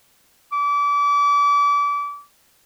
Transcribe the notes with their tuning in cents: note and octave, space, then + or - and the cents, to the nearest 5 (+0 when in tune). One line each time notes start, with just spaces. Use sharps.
D6 -30